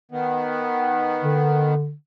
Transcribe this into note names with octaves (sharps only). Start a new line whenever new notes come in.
D#3 B3
D3